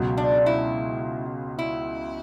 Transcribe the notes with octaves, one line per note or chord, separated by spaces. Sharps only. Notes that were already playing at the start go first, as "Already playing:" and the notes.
Already playing: C#2 B2 F#3
D4
E4
E4